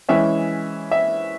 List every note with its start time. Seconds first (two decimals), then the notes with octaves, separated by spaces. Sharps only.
0.09 E3 G#3 C#4 E5
0.91 E5